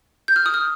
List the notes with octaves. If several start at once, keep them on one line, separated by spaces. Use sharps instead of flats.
G6
F6
D#6
F6